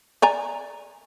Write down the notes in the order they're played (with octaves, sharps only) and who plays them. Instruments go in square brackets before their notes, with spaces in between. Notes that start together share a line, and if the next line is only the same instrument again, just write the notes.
[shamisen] D5 G#5 A#5